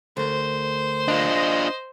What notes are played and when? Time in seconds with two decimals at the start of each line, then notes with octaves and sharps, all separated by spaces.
0.17 D2 A#4 C5
1.08 D4 F4 D#5